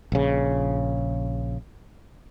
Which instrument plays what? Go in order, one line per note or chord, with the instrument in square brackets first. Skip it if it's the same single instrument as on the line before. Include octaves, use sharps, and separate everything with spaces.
[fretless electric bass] A#1 C#3